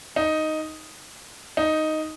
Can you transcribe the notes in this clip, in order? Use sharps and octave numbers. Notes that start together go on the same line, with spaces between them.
D#4
D#4